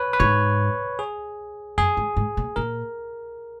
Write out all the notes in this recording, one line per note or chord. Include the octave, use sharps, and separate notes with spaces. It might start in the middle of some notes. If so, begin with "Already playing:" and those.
Already playing: B4 C#5
B4
G#2 C#5
G#4
F#2 G#4
G#2
G#2
A#2
A#2 A#4